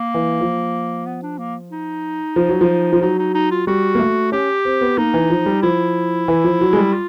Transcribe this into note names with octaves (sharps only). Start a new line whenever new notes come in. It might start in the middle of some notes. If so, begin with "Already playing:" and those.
Already playing: A#3
E3
F3
B3
D4
A#3
D#4
F3
F#3
F3
F3
F#3 D#4
D#4
D#4
F4
G3 F#4
A#3
A3
C#4 G4
C4
B3
A#3 D#4
E3
F3
G3
F3 E4
E3
F3
F#3
G#3
G3
F4